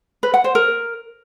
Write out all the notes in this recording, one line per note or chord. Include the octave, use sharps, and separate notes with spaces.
B4
F#5
C5
A#4